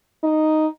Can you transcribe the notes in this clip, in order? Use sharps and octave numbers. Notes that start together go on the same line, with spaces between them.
D#4